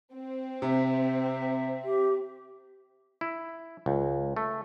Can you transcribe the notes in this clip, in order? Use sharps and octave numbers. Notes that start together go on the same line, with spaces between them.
C4
C3 E5
G4
E4
C#2
A3